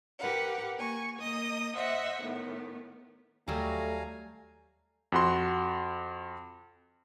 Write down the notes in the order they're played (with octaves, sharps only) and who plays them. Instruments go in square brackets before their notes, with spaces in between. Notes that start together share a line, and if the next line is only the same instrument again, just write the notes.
[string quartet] G4 A#4 B4 F#5
A#3 G#5 C#6
A#3 D#5 D#6
C5 D#5 E5 F#5
A2 D#3 B3
[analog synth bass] D#2 [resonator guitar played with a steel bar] F#3 G3 [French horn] A3 [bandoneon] F5 G#5 A#5
[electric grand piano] F2 F#4 C6